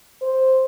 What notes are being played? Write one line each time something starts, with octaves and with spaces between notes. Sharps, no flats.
C5